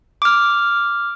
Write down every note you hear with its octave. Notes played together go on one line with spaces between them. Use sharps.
D6 F6